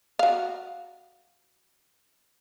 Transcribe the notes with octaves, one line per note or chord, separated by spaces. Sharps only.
F#4 F5